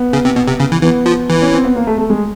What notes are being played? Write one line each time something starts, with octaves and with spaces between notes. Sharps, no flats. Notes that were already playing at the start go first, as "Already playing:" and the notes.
Already playing: B3
C#3
C3
B2
C3
C#3
E3
E3 B3
F3
E3
C#4
C4
B3
A#3
A3
A3
G#3